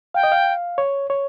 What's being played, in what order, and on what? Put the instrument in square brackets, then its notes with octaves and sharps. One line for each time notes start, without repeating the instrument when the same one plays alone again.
[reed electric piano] F5 [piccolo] G5
[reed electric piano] D#5
F5
C#5
C#5